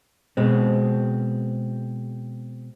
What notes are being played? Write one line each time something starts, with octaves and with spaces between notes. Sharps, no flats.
B2 G#3 C4